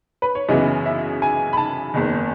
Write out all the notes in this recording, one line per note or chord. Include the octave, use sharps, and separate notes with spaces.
B4
C#5
F#2 C#3 E3 B3 E4 D#5
E5
G#5
B5
A5
F#1 E2 D#3